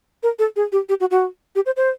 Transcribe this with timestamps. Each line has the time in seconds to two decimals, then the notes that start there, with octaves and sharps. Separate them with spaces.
0.23 A#4
0.39 A4
0.56 G#4
0.72 G4
0.89 G4
1.00 F#4
1.11 F#4
1.55 G4
1.66 C5
1.77 C5